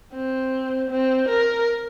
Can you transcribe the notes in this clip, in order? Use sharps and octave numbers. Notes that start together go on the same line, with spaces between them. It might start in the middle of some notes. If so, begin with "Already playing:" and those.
C4
C4
A#4